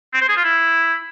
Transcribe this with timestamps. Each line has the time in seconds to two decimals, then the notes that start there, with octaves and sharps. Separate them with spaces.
0.13 C4
0.21 C5
0.29 G#4
0.36 F4
0.44 E4